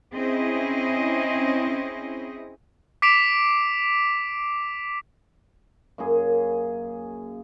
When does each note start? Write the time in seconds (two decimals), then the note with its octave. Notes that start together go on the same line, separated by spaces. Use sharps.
0.14 C4 C#4 E4 G#4 D#5
3.02 D6 B6 C7 D7 E7 F7
5.98 F#2 A#3 G#4